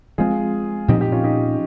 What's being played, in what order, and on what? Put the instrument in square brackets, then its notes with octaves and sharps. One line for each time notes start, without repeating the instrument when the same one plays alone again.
[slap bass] F3 G#3 C4 [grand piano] F4 G#4
[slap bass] A#2 F3 C4 [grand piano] D#4 G4
[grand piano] D#4 G4
C#4 F4
D#4 G4